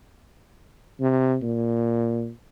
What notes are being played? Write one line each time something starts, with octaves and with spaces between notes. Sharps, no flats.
C3
A#2